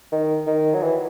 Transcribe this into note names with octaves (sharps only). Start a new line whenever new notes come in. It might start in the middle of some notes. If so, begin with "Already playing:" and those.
D#3
D#3
F#3
E3